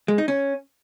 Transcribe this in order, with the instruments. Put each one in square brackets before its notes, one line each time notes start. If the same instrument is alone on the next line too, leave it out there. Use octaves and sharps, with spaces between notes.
[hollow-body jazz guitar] G#3
D#4
C#4